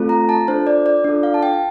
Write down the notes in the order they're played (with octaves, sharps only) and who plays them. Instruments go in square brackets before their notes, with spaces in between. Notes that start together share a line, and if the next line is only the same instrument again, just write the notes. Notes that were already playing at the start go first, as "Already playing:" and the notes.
Already playing: [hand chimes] A3 C4 F4 A4
A#5
A5
D4 F4 A4 C5
D5
D5
D4 F4 A4 D5
F5
A5
G5